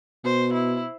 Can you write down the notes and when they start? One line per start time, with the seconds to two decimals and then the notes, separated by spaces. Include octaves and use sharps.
0.25 B2 C5
0.54 E4